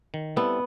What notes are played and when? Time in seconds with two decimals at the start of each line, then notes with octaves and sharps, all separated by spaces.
0.14 D#3
0.36 G3 B3 C4 E4 A4